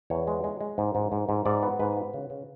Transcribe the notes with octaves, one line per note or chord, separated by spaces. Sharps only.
E2 C#5
G#3
G#3
G#3
G#2
G#2
G#2
G#2
G#2 D5
B3
G#2 B4
B3
C#3
C#3